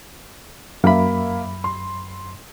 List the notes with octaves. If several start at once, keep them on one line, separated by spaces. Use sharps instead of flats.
F#2 A#3 E5 B5
C6